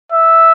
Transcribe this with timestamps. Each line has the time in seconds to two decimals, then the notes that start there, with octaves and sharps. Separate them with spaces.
0.12 E5